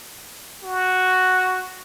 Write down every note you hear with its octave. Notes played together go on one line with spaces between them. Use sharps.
F#4